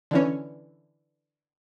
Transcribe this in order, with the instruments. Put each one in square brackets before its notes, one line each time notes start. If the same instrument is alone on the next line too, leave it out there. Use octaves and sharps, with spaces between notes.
[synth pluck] D3 E3 C#4